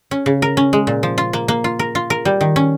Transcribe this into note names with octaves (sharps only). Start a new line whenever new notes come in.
C#4
C#3
A#4
C#4
G#3
A#2
F3
F4
A#3
A#3
F4
A#4
F4
A#4
G3
D#3
C#4